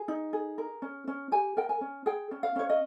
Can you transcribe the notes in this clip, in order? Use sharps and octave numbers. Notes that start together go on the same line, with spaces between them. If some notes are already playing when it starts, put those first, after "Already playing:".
Already playing: G#4
D#4
G#4
A#4
C#4
C#4
G4 G#5
A#4 G5
G#5
C#4
G#4 G5
C#4
F5
C#4 C#5
D#5